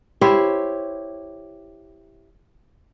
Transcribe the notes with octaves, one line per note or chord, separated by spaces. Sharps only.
E4 G4 C5 C#5